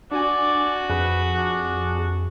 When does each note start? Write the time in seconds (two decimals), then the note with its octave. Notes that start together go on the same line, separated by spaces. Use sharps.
0.12 D4 F#4 D5 G#5
0.90 F2 G#4 B4
1.37 D4